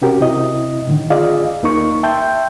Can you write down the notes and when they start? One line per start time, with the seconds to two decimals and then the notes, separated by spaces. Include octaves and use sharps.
0.02 C3 C#4 F#4 G4 A#4
0.21 C3 E4 D#5
0.87 A2 D3 D#3
1.10 F4 G#4 D5 D#5 F5
1.63 D#2 A#3 D#4 A#4 C#6
2.03 E5 G5 A5 C6 G6